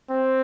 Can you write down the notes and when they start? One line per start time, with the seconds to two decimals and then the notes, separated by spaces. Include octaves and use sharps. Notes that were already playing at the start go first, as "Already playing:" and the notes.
0.11 C4